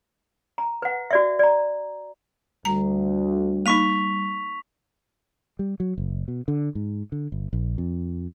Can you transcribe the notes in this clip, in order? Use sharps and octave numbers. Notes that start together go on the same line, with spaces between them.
A#5
B4 F#5
F#4 D5 E5
D5 A#5
D2 G3 A#5
A#3 D#4 C#6 B6 F7
G3
F#3
F#1
B2
D3
G#2
D3
G1
A#1
F2